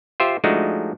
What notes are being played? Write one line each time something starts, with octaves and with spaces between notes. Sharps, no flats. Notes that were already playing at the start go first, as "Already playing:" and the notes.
F4 G4 C5 E5
F3 G#3 A3 D4 D#4 F#4